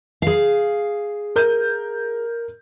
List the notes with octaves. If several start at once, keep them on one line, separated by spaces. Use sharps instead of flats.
G#4 F5
A#4 G6